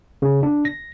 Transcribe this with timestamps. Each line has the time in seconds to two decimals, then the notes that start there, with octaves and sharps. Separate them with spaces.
0.22 C#3
0.43 D4
0.65 A#6